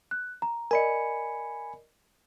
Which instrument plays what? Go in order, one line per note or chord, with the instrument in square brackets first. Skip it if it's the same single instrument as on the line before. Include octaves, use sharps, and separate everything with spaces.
[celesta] F#6
A#5
[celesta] A#4 D5 D#5 [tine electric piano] G#5 B5 C#7